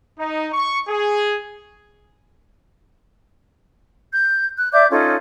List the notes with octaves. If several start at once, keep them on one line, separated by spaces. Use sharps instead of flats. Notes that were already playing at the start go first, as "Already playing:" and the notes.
D#4
C#6
G#4
G6
F#6
D5 E5 D6 G6
C#4 D#4 F4 A4